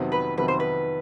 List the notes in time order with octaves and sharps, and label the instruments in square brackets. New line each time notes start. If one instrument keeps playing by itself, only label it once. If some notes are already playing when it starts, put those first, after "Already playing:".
Already playing: [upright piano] F2 C3 D#3 F#3 B3
[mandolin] B4
[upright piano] F2 C3 D#3 F#3 B3 [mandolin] B4
[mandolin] C5
B4